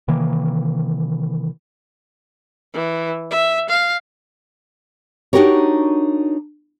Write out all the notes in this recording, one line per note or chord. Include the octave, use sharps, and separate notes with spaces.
C3 D#3 E3 A#3
E3
E5
F5
D4 D#4 F#4 G4 A#4 C#5